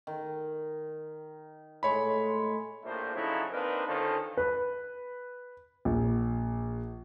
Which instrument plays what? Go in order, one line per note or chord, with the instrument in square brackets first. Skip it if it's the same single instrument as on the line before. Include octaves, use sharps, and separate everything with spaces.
[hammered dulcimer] D#3
[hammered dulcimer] A2 G#3 [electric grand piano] C#5 B5
[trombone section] A#1 A2 A3 A#3 D4 C5
C#3 F3 F#3 D#4 E4 A4
A#3 C4 D4 D#4 A#4 B4
D3 D#3 F3 C#4 A4
[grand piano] B4
A#1